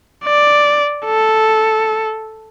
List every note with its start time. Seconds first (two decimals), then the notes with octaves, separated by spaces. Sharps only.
0.25 D5
1.06 A4